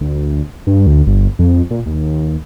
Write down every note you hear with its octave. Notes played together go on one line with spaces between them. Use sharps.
D2
G2
D2
G1
F2
A#2
D#2